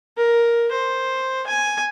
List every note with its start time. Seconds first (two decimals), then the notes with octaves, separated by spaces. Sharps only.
0.18 A#4
0.72 C5
1.47 G#5